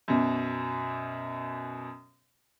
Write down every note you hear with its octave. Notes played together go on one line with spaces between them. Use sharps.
F#2 B2